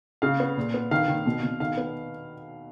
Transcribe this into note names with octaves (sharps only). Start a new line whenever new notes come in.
C#3 F5
B3
A#2
B3
D#3 F5
D#3
B2
B2
D#3 F5
B3